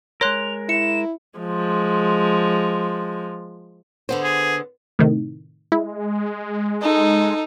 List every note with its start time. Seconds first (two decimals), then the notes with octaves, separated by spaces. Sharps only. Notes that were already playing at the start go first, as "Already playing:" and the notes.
0.21 G#3 A#4 C#5 C6 F#6 F7
0.69 E4 C#7 E7
1.39 F3 G#3
4.09 D3 B3 C5
4.23 G#4
4.99 A2 C3 D#3
5.72 G#3 E4
6.82 D#4 A4